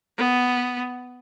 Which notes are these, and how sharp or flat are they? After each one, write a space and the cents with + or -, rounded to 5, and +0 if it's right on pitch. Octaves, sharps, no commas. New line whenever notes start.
B3 +5